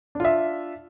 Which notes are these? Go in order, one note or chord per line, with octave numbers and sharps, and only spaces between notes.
D4 F4 E5